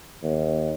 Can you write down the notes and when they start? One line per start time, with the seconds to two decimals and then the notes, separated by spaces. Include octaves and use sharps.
0.23 D#2